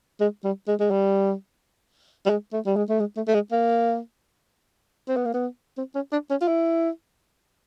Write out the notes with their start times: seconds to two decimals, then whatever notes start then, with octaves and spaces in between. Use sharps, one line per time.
0.21 G#3
0.44 G3
0.68 G#3
0.80 G#3
0.91 G3
2.26 G3
2.30 G#3
2.53 A3
2.66 G3
2.76 G#3
2.89 A3
3.00 G#3
3.17 A3
3.28 A3
3.34 G#3
3.52 A#3
5.08 C4
5.17 B3
5.25 A#3
5.34 B3
5.78 C4
5.95 C#4
6.12 D4
6.31 C#4
6.41 F4
6.48 E4